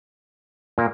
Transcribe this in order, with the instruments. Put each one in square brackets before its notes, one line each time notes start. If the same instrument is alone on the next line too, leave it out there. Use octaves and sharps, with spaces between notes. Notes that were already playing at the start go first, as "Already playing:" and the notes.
[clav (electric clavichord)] A#2 A#3